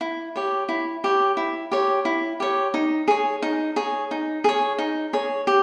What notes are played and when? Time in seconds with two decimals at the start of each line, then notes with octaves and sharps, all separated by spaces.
0.01 E4
0.36 G4 C#5
0.69 E4
1.04 G4 C#5
1.37 E4
1.72 G4 C#5
2.05 E4
2.40 G4 C#5
2.74 D#4
3.08 G#4 C#5
3.42 D#4
3.76 G#4 C#5
4.11 D#4
4.44 G#4 C#5
4.78 D#4
5.13 G#4 C#5
5.47 G4